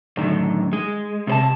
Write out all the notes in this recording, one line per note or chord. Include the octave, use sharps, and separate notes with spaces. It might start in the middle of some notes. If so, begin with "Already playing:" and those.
F#2 A2 D3 D#3
G#3
C3 C5 A5